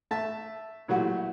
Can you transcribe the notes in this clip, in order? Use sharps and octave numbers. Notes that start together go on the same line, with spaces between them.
A3 E5 A5
A#2 F#3 A3 E4 F#4 G4